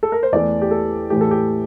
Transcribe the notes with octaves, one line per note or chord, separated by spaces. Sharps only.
A4
A#4
C5
E2 E3 A3 D5
G4
A4
A2 E3 A3 G4
A4
G4